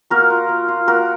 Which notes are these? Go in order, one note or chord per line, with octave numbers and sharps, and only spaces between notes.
A#3 F#4 A#4
F4
A#3
F4
A#3 F#4 A#4